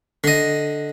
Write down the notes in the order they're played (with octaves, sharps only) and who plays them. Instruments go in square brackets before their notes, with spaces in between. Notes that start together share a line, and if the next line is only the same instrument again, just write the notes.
[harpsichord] D3 D#5